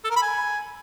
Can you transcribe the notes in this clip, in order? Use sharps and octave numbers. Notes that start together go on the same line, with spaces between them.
A4
A#4
B5
G#5